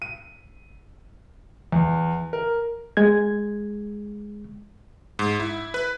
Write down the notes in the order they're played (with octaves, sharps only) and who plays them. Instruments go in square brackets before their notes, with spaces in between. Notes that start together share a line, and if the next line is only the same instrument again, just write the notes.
[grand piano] D#7
E2
A#4
[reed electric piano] G#3 G#6
[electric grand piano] G#2
E4
B4